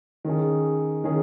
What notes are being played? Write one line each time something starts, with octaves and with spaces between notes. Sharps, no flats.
D#3 C#4 G#4
D#3 C#4 G#4